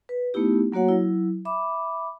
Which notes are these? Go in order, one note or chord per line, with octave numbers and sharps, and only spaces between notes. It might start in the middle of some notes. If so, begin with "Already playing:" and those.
B4
A3 B3 D#4 E4 G4
F#3 A#3 F#4 C#5 F#5
F#3 E4
E5 B5 D6